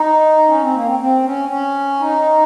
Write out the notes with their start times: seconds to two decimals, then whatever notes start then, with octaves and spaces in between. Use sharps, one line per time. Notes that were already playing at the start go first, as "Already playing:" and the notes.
Already playing: D#4
0.48 C#4
0.62 C4
0.74 A#3
0.86 C4
0.99 C4
1.24 C#4
1.49 C#4
2.00 D#4